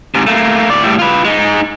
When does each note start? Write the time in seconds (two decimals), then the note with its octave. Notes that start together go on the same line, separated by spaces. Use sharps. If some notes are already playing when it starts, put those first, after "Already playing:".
0.15 G#2 C3
0.27 A3 A#3
0.70 A2 D5
0.83 A2 G3
0.99 F4 B4
1.25 G#3 D#4